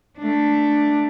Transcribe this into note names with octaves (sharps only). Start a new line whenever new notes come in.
A3 D4